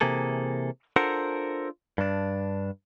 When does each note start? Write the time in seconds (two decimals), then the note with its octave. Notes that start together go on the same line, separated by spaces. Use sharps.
0.01 C3 E3 A#3 G#4 A4
0.96 D4 F4 A4 A#4 C5 F#5
1.98 G2 D4